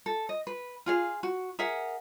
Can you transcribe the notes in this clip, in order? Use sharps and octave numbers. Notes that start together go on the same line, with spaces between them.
A4
D#5
B4
F4 G#4 F5
F#4
G#4 A#4 E5 F#5